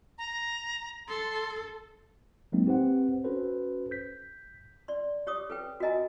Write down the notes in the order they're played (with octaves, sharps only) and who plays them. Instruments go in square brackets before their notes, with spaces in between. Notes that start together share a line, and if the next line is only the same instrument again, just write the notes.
[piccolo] A#5
[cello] A4 [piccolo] C6
[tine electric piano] F3 F#3 G#3 A#3 C4 D#4
C4 G4 B4 C5 F#5
C#4 F#4 A4 B4 C5
G6 B6
[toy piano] D5 C6
G4 C#5 D6 D#6
A4 B4 G5
F#4 A4 A#4 D#5 G#5 A#5